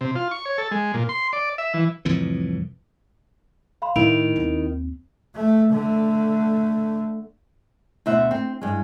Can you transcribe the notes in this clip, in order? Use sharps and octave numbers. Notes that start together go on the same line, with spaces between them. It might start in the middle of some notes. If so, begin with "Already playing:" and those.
C3
F4
C#6
C#5
A4
G#3
A#2
C6
D5
E5
E3
C2 F2 A2 E3
F5 B5 C6
A2 D#3 A3 E4 B5 D7 F7
D#2 C4
A3
D3 A3
D2 B2 C5 E5 F#5
C4
G2 G#3